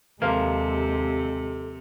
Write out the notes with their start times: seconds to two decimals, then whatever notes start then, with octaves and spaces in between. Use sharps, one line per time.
0.22 D#2 C3 F3 G#3 A#3 A4